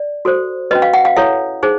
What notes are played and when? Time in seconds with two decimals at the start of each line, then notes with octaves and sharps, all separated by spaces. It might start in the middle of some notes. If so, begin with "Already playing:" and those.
Already playing: D5
0.25 F#4 A4 C5
0.71 C#4 F#4 B4 D#5
0.82 F5
0.94 F#5
1.05 F5
1.17 E4 A4 C#5 E5
1.63 D#4 G#4 C5